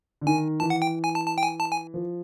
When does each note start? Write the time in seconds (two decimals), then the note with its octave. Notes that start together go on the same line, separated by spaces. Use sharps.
0.21 D3
0.26 D#3 G#5
0.60 E3 A5
0.70 F#5
0.82 G5
1.04 G#5
1.15 A5
1.26 A5
1.38 G5
1.43 G#5
1.60 A5
1.71 G#5
1.94 F3